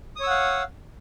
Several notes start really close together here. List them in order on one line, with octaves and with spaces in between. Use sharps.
D#6 C#5 E6 F#5 F5